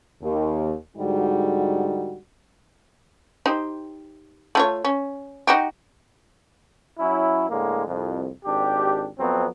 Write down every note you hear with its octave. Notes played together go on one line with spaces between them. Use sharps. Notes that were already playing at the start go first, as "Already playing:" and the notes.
D#2
G#2 D3 G3 D#4 F#4
D#4 G4 C5
A3 F4 C#5
C#4
D#4 F#4 G4
F#3 C#4 E4
A2 D3 G#3 A#3
C2 F2
G#1 D4 G4
F2 F#3 B3 C4